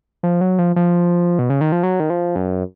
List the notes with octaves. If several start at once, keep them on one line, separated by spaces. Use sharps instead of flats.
F3
F#3
F3
F3
B2
C#3
D#3
F3
F#3
D#3
F3
F#2